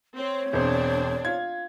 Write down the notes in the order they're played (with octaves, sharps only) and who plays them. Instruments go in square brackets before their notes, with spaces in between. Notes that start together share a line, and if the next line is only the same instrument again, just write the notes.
[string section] C4 [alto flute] C#5
[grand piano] E1 C5 [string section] C4 D4
[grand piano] F4 G#6